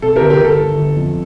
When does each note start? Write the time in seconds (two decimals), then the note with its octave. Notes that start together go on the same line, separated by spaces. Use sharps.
0.02 C3 A4
0.16 G1 G4 A#4
0.30 G4 A#4
0.40 G1 A4
0.58 G1
0.78 G1
0.96 F2